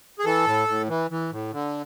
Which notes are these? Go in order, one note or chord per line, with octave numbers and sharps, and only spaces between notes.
G#4
E3 A4
A2
A2
E3
E3
A2
D3